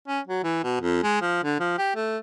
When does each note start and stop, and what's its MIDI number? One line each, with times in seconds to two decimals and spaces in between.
0.07 0.20 61
0.27 0.43 54
0.43 0.58 52
0.63 0.77 47
0.81 1.03 41
1.03 1.21 56
1.21 1.43 53
1.44 1.57 50
1.60 1.73 53
1.78 1.92 67
1.95 2.17 57